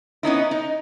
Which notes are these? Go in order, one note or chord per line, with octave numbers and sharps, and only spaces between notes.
B3 C#4 D#4 E4
D#4